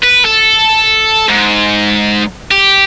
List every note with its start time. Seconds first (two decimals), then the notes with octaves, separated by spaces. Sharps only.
0.03 B4
0.25 A4
1.29 G#2
2.51 G4